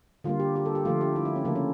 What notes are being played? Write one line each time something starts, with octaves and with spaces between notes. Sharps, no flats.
D3 G3 A#3 F4
G4
G4
A4
G4
D3 F3 A3 F4
G4
E4
D4
C#4
C#3 F3 A3 A#3
C#4